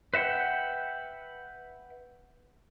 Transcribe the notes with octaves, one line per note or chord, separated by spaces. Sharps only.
B4 E5 F#5 G5